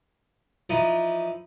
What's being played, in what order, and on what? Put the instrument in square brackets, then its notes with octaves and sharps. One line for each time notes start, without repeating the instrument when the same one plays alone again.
[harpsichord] E3 F3 D#4